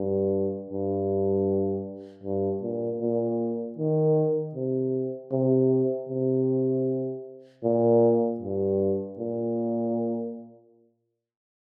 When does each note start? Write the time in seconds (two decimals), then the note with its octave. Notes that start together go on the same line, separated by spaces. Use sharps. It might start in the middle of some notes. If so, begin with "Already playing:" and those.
Already playing: G2
0.70 G2
2.24 G2
2.63 A#2
3.01 A#2
3.78 D#3
4.55 C3
5.32 C3
6.09 C3
7.63 A#2
8.40 G2
9.18 A#2